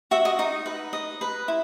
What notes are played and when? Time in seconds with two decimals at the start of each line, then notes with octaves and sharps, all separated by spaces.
0.11 F#4 E5
0.25 D#5
0.39 D#4 D#5
0.66 B4
0.93 D#5
1.21 B4
1.48 E4